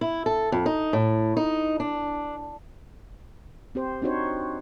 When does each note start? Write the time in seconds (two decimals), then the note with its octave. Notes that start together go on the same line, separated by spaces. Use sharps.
0.01 E4
0.26 A4
0.52 F2
0.66 D#4
0.93 A2
1.37 D#4
1.80 D4
3.75 C4 G4 C5
4.02 C4 D4 D#4 F#4 C5 C#5